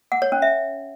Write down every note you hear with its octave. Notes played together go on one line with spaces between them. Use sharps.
F#5
C#5
C#4
E5